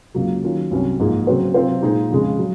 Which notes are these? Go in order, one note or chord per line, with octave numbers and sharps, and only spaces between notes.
C#2 C#3 F#3 A#3
D#3 F#3 C#4 F4
C2 C3 F#3 C#4
G#2 F3 A#3 F4 G#4
C#3 F#3 C4 F#4 C5
C3 F#3 C4 F4 C5
A#2 G#3 D#4 G#4
F2 C#3 G#3
F#3